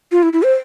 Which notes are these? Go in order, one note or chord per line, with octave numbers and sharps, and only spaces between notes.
F4
E4
E4
C5